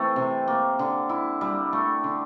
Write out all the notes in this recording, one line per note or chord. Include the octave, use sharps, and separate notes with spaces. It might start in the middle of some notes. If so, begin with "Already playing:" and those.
Already playing: E3 A3 C4
C3
A#3
D3
E4
G3
A3
D3